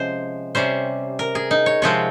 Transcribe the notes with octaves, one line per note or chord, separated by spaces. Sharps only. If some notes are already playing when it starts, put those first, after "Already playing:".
Already playing: C3 F3 G#3 C#4 C5
C3 G3 C#4 C5
A#4
G#4
D#4
C#5
C3 F3 G#3 C4 C#5